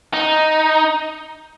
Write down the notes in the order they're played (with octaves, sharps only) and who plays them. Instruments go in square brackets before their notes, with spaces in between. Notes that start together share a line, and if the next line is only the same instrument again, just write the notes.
[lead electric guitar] D#4